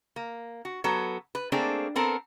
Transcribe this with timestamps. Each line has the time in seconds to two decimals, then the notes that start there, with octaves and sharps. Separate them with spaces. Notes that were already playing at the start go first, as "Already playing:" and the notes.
0.16 A#3
0.65 F#4
0.84 F#3 B3 A4
1.35 B4
1.52 A3 A#3 C4 D4 G#4
1.96 B3 C4 A4 A#4